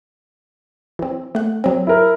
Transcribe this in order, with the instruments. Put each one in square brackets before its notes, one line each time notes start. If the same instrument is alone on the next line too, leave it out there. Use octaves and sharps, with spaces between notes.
[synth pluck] E3 C4
A3 F#5
F#3 C4
[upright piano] E4 A#4